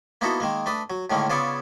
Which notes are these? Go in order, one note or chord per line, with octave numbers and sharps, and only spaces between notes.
A#3 B3 D#4 E4 F#4 A4
D#3 G#3 A#3
A3 D4 B4 D#6
F#3
A2 D3 D#3 G#3 A#3 C#4
C#3 B3 F4 G#4 C#5 D5